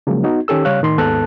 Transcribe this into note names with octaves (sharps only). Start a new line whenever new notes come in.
C#3 F3 F#3 G#3 A#3
B3 D#4 F#4
D#3 C#4 G4 A4 E6
C#3 G3 C#5 F5 F#6
A2 D#3 C6
D#2 G#2 B3 A4 A5 F#6